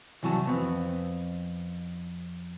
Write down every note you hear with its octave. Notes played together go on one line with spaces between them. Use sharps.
C2 E3 F#3 F#4 A5
F2 B3 C4